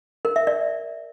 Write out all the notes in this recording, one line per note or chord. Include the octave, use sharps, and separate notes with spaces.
A#4
E5
D5